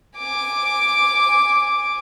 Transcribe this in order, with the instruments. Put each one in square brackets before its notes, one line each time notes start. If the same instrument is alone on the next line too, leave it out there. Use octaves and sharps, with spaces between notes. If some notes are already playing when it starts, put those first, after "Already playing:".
[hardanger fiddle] G#5 D6